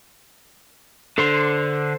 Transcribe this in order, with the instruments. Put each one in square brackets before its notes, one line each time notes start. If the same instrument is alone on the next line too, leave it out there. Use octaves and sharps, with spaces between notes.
[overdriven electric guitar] D3 [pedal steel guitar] A4 C5 C6